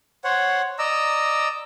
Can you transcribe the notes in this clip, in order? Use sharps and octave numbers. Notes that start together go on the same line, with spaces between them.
C5 C#5 F#5
D5 D#5 A#5 E6